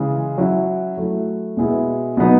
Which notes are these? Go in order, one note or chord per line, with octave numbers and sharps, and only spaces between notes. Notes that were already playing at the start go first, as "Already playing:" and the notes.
Already playing: C#3 E3 G#3
F#3 C#4 E4
F#3 A3 E4
B2 G#3 B3 E4
B2 F#3 B3 D#4